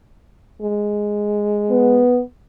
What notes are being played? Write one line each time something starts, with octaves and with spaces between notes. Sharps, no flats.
G#3
B3